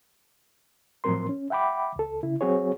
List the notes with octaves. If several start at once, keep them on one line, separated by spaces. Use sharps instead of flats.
A2 F3 F#3 C4 A#4 C6
C#4
E5 F#5 G5 B5 D6
C#2 A4
C#3 E4
F#3 C4 F#4 G#4 C#5